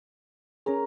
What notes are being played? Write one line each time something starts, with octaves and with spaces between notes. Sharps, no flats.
C#4 G#4 A#4 C#5